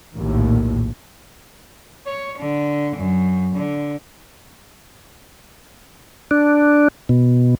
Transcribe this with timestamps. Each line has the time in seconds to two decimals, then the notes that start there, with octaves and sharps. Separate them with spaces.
0.15 A#1 D#2 A2
2.06 C#5
2.38 D3
2.96 F#2
3.54 D3
6.31 D4
7.09 B2